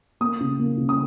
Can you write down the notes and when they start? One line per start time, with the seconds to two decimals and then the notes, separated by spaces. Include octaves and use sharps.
0.21 A#3 D#6
0.40 C#3
0.59 A#3
0.78 C#3
0.89 D#6